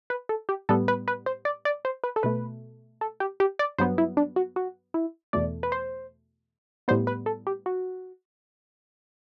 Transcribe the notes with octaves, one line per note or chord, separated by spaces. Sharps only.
B4
A4
G4
A2 G3 B3 A4
B4
B4
C5
D5
D5
C5
B4
A4
B2 A3 B4
A4
G4
G4
D5
G2 F#3 B3 C5
E4
D4
F#4
F#4
E4
E2 B2 A3 D5
B4
C5
A2 G3 B3 C5
B4
A4
G4
F#4